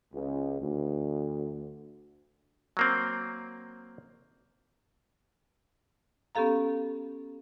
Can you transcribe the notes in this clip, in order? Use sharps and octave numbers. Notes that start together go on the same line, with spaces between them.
C#2
D2
F#3 A#3 C4
B3 C#4 G4 A4 F5 A#5